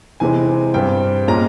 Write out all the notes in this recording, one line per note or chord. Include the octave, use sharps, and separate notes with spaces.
C3 E3 G#3 C4 G#5
G2 G3 C4 G5
A#2 G#3 C#4 A#5